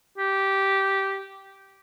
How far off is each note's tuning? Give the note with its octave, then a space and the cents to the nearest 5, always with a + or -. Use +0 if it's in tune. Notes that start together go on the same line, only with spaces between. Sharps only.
G4 -10